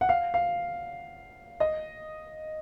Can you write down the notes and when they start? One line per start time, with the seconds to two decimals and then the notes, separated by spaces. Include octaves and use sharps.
0.01 F#5
0.09 F5
0.34 F5
1.60 D#5